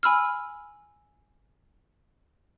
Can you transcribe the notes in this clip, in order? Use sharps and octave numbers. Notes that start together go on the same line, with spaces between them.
G#5 B5 E6 F6